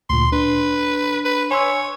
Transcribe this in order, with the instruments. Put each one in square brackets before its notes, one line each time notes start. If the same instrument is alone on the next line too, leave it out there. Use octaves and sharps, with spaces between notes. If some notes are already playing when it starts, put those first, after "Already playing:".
[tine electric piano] D2 A#2 [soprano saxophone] C6
[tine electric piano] D4 [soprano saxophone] B4
[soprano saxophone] B4
[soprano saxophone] C#5 [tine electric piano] G#5 C6 E6